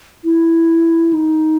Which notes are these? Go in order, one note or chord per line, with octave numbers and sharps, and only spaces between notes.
E4
D#4